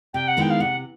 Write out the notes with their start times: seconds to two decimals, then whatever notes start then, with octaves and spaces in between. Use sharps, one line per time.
0.14 C3 G5
0.28 F#5
0.37 D#3 G#3 B3 E4 G5
0.50 F5
0.60 C3 F#5